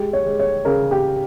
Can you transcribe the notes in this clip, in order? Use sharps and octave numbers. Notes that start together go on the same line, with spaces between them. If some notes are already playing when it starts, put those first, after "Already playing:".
Already playing: G#3 G4
C#5
G#3
C#5
C#3 A#4
G4